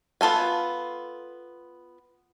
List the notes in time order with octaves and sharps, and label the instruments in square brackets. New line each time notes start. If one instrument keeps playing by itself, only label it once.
[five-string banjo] B3 F4 A4 G#5